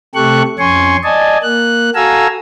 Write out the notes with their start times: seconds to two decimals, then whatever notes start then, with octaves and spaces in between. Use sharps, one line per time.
0.15 C3 A3 G4 A4 C#6 F#6
0.59 F2 C#4 G#5 C6 C#6
1.04 D5 D#5 G#5 A5
1.43 A#3 F#6
1.95 F#4 A4 F5 G#5 A#5 E6